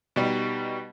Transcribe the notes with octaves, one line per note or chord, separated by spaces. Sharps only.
B2 G3 D#4